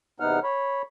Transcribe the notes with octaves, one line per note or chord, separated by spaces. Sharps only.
E2 C3 B3 D#4 F#5 F6
C#5 B5